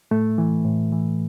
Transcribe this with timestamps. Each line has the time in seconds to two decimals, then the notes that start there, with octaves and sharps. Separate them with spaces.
0.11 A2 A3
0.38 E3
0.65 A2
0.92 E3